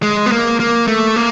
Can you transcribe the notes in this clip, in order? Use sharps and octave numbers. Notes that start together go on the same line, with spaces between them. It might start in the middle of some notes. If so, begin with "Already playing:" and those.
G#3
B3
A#3
A#3
A3
A#3